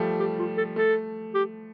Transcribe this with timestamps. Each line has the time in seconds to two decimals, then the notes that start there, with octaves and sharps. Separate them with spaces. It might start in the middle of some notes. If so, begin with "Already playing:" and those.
Already playing: F3 G3 A3
0.20 G4
0.39 F4
0.57 A4
0.76 A3 A4
1.34 G4